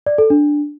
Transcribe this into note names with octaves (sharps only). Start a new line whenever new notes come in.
D5
A4
D4